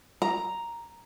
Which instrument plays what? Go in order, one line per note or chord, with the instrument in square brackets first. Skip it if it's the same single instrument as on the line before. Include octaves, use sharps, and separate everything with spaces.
[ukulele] A#5